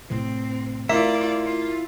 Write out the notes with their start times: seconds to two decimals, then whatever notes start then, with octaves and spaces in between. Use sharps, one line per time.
0.10 A2 C3 E3 C4
0.89 A3 A#3 E4 F4 D5 E5
1.44 F4